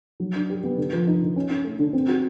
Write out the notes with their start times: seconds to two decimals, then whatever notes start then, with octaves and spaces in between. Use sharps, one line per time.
0.20 F#3
0.35 D4
0.50 G4
0.63 B3
0.77 D3
0.93 F3
1.07 D#4
1.22 D3
1.36 C#4
1.50 C#4
1.64 A3
1.79 D3
1.93 C4
2.08 F#4